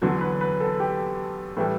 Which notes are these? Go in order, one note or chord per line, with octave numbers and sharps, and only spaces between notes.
E2 D3 F#3 A4
B4
B4
A4
G4
A2 E3 G3 A4